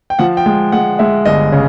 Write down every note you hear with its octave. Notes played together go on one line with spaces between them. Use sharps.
G5
F3 F#5
G5
G#3
G#3 F#5
G#3 E5
G1 D#5
C#3